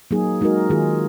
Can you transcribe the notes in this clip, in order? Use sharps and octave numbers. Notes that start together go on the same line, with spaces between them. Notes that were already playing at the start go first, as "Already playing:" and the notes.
F#3 A#3 D#4 G#4
G#3 D#4 F#4 A#4
D#3 A#3 F4 G#4